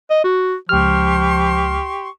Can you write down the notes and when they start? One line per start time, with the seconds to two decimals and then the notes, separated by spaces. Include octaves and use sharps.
0.10 D#5
0.24 F#4
0.69 C#2 F3 G4 C6 C#6 F6